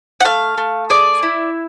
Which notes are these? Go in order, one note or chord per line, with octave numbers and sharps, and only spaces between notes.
F#5
A3 F5
A3
G#4 D5
E4